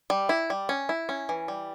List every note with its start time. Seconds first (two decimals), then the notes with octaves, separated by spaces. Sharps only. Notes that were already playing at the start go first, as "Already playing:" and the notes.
0.10 G3
0.29 E4
0.50 G3
0.69 C#4
0.89 E4
1.09 C#4
1.29 E3
1.48 G3